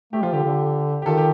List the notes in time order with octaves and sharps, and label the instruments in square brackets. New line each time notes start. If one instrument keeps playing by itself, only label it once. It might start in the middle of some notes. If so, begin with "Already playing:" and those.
[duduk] A3 [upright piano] G4
[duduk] F3 [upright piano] F4
[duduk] D3 [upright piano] G4
[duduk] D3
[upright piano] G4
[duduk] D#3 [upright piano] F4 A4
[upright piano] G4